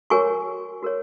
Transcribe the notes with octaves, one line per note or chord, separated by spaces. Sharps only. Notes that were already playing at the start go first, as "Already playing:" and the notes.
F#4 A#4 C#5 G#5 C#6
F#4 A#4 C#5